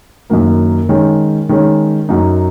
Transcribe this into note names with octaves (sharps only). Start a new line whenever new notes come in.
F#2 D#3 F#3 A#3
D#3 G#3 C#4
D#3 G#3 C#4
F#2 F#3 D#4